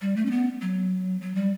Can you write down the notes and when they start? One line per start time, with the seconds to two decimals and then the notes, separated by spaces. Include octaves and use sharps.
0.01 G3
0.16 A3
0.26 C#4
0.31 B3
0.62 F#3
1.21 F#3
1.35 G3